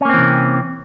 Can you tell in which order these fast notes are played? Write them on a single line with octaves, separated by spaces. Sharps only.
C#4 A#3 C4 E3 C3